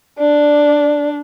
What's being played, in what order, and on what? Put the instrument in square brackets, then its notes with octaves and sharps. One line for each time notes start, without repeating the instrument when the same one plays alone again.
[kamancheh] D4 [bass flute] D5